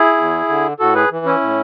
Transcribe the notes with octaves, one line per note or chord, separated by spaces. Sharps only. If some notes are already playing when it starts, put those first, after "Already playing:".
Already playing: E4 G#4
E2
D3
A2 F#4 A4
G#4 B4
E3
C#4 E4
A2